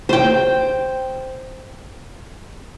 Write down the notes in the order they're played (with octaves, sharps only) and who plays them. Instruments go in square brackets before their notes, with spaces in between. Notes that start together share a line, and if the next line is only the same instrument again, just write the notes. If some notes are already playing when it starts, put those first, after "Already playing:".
[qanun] C5 G5